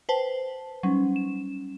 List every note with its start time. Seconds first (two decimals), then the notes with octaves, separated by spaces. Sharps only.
0.09 B4 C5 G5 A5
0.83 F#3 G3 C#4 D#4
1.16 E7